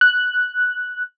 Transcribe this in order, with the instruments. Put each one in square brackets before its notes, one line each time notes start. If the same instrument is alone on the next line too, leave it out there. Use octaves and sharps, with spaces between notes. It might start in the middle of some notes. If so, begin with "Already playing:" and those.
[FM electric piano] F#6